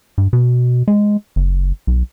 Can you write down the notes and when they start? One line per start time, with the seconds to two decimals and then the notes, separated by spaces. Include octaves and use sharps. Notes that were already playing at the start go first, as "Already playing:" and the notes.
0.18 G2
0.33 B2
0.88 G#3
1.36 F#1
1.87 B1